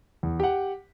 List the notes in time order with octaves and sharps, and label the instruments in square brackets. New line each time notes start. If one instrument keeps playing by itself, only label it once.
[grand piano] E2
G4 F#5